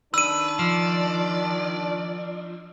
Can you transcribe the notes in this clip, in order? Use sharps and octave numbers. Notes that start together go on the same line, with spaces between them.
D#3 D4 B4 E6 D#7
F3 D5